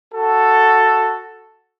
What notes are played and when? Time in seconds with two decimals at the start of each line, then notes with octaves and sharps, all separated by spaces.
0.14 F#4 A4